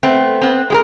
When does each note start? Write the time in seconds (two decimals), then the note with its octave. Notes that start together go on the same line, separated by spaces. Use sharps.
0.03 A3 B3 C4
0.41 B3 C4
0.70 G#3 G4 A#4